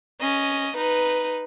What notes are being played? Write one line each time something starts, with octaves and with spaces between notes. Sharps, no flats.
C#4 D#5
D#4 B4